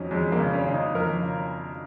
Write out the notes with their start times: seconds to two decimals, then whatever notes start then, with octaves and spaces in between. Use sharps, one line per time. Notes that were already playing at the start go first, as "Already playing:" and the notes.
Already playing: F2 F#3 C#4 D#4
0.11 F2 G#3
0.32 A#3
0.39 C#3
0.54 C#4
0.67 C#3
0.73 D#4
0.95 F2 A#4
1.22 C#3